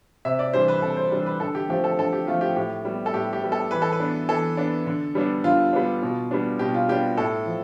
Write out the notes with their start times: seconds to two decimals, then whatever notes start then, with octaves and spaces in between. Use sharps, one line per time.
0.25 C3 E5
0.39 D5
0.53 E3 G3 D4 C5
0.68 B4
0.82 C3 A4
0.97 C5
1.12 E3 G3 D4
1.26 B4
1.40 D3 A4
1.55 G4
1.69 F3 A3 C4 G4
1.84 A4
1.99 D3 A4
2.13 G4
2.27 F3 A3 C4 F4
2.41 G4
2.55 A2 G4
2.85 G3 B3
3.06 A4
3.14 A2 G4
3.33 G4
3.43 G3 B3
3.52 A4
3.71 E3 B4
3.82 A4
3.93 B4
4.00 B3 D4
4.29 E3 A4
4.57 B3 D4
4.87 D3
5.15 G3 B3 D4
5.44 D3 F4
5.73 G3 B3 D4
6.03 B2
6.31 G3 B3 D4
6.59 B2 G4
6.74 F4
6.89 G3 B3 D4 G4
7.17 A2 A4
7.46 F3